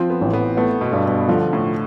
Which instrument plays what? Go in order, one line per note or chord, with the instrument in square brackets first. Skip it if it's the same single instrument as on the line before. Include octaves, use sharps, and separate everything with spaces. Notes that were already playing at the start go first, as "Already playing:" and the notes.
Already playing: [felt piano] F3 [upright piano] C4
[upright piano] B3
[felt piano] A1
[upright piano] B3
[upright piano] A3 [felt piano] B3
[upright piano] B2
[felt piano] G2
[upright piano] B2
[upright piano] D3 [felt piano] F3
[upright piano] A2